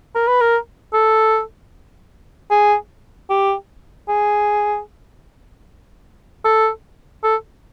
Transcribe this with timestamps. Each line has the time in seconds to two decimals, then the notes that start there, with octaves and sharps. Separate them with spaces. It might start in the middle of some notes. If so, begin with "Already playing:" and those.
0.15 A#4
0.27 B4
0.41 A#4
0.94 A4
2.51 G#4
3.30 G4
4.08 G#4
6.45 A4
7.23 A4